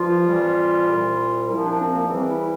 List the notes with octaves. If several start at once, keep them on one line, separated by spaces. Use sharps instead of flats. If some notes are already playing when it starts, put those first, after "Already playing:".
Already playing: G2 F3 F4
F2 E3 G3
C2 A#2 G3
C2 A#2 F3 E4
D4
C4
A#3
E2 C3 E3 G3 C4
E4